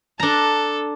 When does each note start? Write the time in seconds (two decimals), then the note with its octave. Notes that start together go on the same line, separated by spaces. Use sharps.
0.20 D4 A4 A#5